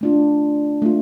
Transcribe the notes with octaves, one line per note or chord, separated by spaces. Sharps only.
A3 D4 F4
A3 D4 F4